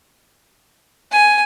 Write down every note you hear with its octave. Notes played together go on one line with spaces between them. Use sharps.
G#5